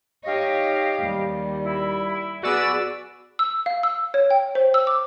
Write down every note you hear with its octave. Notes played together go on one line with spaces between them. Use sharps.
D#4 G4 C#5 D#5 F5
D#2 G3
E4
B3 F#4 G#4 D5 E6
E6
F5
E6
C#5
G5
C5
E6
D6